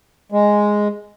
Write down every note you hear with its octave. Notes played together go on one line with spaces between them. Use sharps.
G#3